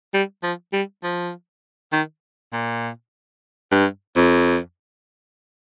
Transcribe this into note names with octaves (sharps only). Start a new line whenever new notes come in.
G3
F3
G3
F3
D#3
A#2
G2
F2